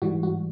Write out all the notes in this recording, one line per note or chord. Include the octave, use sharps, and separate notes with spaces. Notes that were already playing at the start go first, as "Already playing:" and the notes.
G#2 E3 G3 F#4
F#4